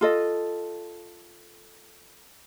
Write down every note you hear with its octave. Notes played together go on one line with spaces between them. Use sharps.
F4 A4 D#5